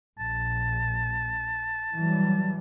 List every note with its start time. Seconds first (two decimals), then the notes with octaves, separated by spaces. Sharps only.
0.19 A#1 A5
1.96 E3 F#3 G3